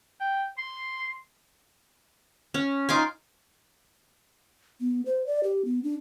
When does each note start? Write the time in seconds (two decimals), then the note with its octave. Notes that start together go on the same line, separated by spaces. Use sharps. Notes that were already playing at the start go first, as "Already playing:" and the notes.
0.21 G5
0.58 C6
2.54 C#4
2.89 D#4 F4 G#5 C6 D6
4.81 B3
5.06 C5
5.27 D5
5.44 G4
5.65 B3
5.84 D4